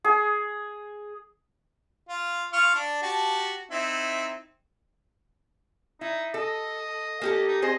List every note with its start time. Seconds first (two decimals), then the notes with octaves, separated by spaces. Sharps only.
0.04 G#4
2.09 F4
2.53 F4 C#6 F6
2.75 D4 D5
3.02 F#4 G4 A5
3.71 C4 D#4 E4
6.01 D#4 E4
6.34 A4 D#5
7.22 A#3 G4 A4
7.48 D#4
7.62 C4 G#4 C5 D#5